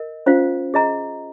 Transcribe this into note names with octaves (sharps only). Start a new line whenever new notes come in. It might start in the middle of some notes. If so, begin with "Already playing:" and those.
Already playing: A#4 D#5
C#4 F4 C5 F5
G#4 D#5 A#5